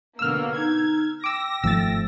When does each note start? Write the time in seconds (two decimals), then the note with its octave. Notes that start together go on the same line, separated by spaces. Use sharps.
0.19 B2 D3 A#3 E6 F6
0.56 D#4 G#6
1.24 G5 D6 E6 A#6
1.64 G#1 F3 A3 E6 A6